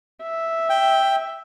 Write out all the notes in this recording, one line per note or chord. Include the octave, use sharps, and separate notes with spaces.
E5
G5